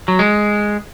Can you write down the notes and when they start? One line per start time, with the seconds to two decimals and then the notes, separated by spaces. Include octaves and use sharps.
0.08 F#3
0.19 G#3